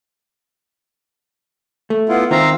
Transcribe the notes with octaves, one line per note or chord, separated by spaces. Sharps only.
A3
B3 E4 F4
D#3 C4 F4 E5 F5 A#5